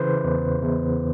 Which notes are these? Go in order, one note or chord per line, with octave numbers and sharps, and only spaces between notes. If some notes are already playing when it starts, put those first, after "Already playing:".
Already playing: C#3 E3 B4 C5
E2
E2